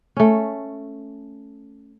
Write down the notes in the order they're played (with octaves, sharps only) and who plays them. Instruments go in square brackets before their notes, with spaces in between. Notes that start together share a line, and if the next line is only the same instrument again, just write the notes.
[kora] A3 C#4